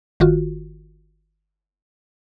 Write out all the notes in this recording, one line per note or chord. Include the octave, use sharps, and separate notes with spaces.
G1 D#3 F4 F#4